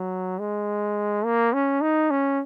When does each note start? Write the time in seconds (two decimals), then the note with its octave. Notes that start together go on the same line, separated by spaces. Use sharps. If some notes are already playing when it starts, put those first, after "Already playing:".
Already playing: F#3
0.39 G#3
1.25 A#3
1.53 C#4
1.81 D#4
2.11 C#4